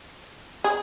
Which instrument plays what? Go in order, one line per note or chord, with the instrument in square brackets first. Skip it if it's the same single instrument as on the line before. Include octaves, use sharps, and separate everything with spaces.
[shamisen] G#4